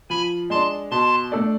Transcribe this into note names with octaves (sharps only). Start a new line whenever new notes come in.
F3 G#5 B5
G#3 D4 A5 C6
B2 A5 C6
A3 D4 A4 D5